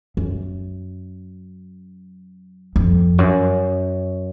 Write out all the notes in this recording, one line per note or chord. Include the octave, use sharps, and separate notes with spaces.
F#2
F2
F#2